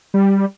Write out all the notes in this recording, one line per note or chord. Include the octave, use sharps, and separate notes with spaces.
G3